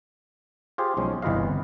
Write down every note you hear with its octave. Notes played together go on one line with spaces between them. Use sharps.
F4 G4 G#4 C5
B1 F3 G#3 C#4
G1 C2 E3 B4 D#5 F5